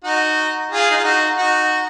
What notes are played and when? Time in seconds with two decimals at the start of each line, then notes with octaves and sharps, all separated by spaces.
0.04 D#4 F#4
0.72 F4 G#4
0.90 D#4
0.96 F4
1.04 D#4 F#4
1.38 D#4 F#4